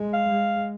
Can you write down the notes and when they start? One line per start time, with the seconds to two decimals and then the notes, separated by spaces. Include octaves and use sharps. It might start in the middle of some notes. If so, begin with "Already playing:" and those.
Already playing: G#3
0.13 F5
0.29 G#3